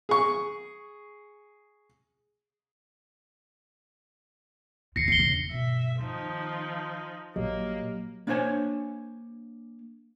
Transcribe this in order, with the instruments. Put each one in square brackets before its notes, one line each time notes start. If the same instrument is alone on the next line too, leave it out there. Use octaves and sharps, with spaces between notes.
[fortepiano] G#4 C#6
[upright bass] E2 D#3 [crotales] A#6 C7 C#7
[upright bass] E2 D4 [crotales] C7 C#7 G7
[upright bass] E2 C#3
[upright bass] G2 B2 [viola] E5
[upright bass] D#3 B3 [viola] F3 D#4
[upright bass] A#1 G3 [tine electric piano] F#3 G4 D#5 [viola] A#3
[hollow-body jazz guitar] A#3 D4 C5 C#5 G#5 A5